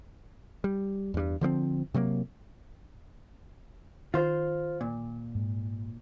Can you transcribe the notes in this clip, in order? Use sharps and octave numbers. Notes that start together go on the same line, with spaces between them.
G3
E2 G2
D3 F3 A3 C4
C3 F#3 G#3 A#3
D#3 F4 C5
A#2
G#2